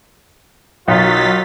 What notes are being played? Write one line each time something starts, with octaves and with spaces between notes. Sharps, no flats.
B1 D#3 F#3 D#4 F4 A6 B6